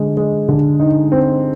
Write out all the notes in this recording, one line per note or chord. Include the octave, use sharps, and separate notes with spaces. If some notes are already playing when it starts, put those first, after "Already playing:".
Already playing: D3 G#3
G#3
D3
D#4
C4